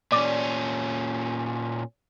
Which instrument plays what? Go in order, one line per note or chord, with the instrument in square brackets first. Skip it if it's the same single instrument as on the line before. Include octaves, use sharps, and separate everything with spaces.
[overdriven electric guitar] A#2 C#4 [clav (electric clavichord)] D5